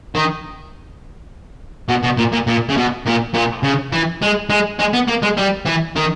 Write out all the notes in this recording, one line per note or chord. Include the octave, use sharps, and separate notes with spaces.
D#3
B2
B2
A#2
A#2
A#2
C#3
B2
A#2
A#2
C#3
E3
G#3
G#3
G#3
B3
A#3
G#3
G3
E3
D#3